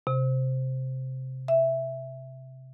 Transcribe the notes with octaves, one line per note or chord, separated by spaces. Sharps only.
C3
E5